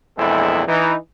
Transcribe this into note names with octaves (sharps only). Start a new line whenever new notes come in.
A#1 E2 G#3 C4 E4 A4
E3 D#4